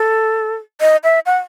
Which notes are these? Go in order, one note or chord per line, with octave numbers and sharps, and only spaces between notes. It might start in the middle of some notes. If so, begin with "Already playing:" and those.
Already playing: A4
D#5
E5
F#5